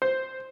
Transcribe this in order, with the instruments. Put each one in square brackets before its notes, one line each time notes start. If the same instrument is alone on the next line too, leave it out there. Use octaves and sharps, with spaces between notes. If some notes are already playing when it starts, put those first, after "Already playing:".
[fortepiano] C5